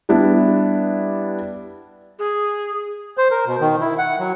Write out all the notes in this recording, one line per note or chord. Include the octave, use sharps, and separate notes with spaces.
G3 B3 D4 E4
G#4
C5
A#4
B2
D#3
E4
F#5
F#3